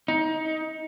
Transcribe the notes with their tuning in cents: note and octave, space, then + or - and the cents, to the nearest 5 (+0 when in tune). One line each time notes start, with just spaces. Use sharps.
D#4 +25